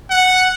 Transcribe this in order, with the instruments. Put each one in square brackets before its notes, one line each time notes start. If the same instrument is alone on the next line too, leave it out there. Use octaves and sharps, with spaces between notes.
[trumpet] F#5